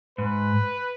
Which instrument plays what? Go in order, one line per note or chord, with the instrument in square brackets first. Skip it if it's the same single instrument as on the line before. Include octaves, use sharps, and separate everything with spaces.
[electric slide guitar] G#2 [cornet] B4